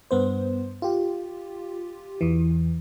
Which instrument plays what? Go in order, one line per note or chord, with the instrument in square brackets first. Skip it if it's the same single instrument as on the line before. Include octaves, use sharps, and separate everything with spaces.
[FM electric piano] G2 B3 C5
F4 G4
E2 E3